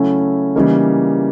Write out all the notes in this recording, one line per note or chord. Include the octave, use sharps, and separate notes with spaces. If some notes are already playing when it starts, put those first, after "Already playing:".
Already playing: C#3 F#3 A3 C#4 E4
C#3 E3 G3 A#3 D#4